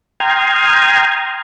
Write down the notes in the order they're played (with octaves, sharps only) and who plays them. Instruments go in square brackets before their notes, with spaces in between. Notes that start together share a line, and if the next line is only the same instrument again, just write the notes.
[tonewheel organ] G5 A#5 C6 D#6 F6 G#6